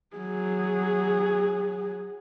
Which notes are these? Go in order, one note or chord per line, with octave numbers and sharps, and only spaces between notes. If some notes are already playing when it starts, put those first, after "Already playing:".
F#3 G#4